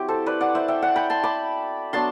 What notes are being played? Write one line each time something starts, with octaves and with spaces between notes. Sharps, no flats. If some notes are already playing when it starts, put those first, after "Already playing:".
Already playing: F#3 C4 E4 G4
A4 C5
B4 D5
D5 F#5
C5 E5
E5 G5
D5 F#5
G5 B5
A5 C6
B5 D6
F#3 B3 D4 A5 C6